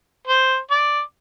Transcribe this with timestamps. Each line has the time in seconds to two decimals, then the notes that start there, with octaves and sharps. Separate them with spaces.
0.27 C5
0.71 D5